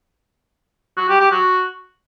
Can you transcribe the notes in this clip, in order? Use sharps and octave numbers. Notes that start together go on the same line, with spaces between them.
F#4
G4
G4
F#4